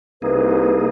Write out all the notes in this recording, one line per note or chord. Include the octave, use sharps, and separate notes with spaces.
C2 A#3 D#4 G#4 B4